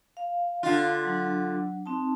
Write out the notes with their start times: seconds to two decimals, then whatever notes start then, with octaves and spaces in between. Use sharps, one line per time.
0.17 F5
0.63 D3 F4
1.05 F#3 D4
1.86 C4 D#4 A5